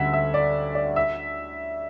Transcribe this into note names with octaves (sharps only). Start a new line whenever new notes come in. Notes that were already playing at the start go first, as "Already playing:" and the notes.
Already playing: D2 D3 G3 C#4 E5 F#5
E5
D5
D5
E5